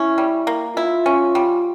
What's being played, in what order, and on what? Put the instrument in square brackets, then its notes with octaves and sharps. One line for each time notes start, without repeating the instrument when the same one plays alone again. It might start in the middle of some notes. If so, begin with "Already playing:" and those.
Already playing: [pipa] C#4 [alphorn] E4
[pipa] G3
A#3
[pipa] E4 [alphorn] F4
[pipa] C#4
G3